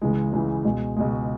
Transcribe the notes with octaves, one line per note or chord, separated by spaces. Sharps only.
C#2 C#3 E3 G#3
C#2 C#3 E3 G#3
C#2 B2 G#3
C#2 B2 G#3